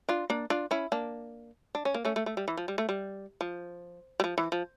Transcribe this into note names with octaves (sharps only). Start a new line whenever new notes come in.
D4 F4
A#3 D4
D4 F4
C#4 E4
A#3 D4
D4
C#4
A#3
A3 C#4
A3
A3
G3
E3
F3
G3
A3
G3
F3
G3
F3
E3
F3